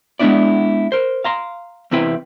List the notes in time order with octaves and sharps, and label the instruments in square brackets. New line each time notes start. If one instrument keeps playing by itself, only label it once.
[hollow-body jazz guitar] G#3 B3 C4 D4 E4 D5
A#4 C5
F5 A#5 C6
E2 C3 C4 E4 B4 G5